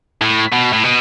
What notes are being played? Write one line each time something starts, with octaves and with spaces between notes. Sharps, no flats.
A2
B2
A2
B2